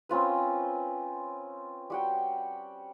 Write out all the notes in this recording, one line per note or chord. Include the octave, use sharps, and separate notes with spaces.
C4 C#4 F4 B4
G3 F#4 G5